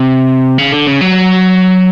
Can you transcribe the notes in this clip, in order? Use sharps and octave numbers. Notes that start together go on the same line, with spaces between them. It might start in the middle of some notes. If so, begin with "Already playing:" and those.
Already playing: C3
C#3
D3
C#3
F#3